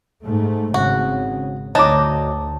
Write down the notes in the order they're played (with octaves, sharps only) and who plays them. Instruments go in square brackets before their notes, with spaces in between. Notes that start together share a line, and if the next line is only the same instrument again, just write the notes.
[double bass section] G#2 A3
[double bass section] G#1 C#3 [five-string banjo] F#4
[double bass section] D2 [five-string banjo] F#3 D#4 [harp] A5 D6